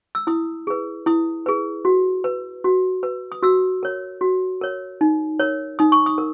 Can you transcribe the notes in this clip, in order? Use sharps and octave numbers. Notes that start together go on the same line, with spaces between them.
E6
E4 D#6
G#4 B4
E4 D#6
G#4 B4
F#4
B4
F#4
B4
D#6
F#4 E6
A#4 C#5
F#4
A#4 C#5
D#4
A#4 C#5
D#4 D#6
C#6
D#6
A#4